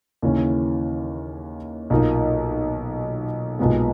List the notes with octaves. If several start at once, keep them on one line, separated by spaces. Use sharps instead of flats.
D#2 C#3 E3 A#3 C#4
B1 A#2 A#3 D#4
B1 A#2 G#3 B3